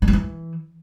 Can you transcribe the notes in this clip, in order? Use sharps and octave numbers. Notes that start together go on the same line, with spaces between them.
D3
C#3
E3